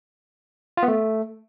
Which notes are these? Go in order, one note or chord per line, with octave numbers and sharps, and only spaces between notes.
F4
B3
A3